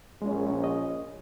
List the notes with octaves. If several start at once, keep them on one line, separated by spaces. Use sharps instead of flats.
A#1 G#3 C#4
D#5